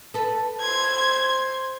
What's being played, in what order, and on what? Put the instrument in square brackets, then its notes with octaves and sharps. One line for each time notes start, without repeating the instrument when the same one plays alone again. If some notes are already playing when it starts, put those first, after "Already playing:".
[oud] A4 B4
[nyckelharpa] C5 C6 [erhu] G#6